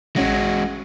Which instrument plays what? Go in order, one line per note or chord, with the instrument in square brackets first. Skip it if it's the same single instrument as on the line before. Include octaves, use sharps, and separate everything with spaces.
[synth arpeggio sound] A1 C#4 A#6 [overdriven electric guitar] G#3 F#4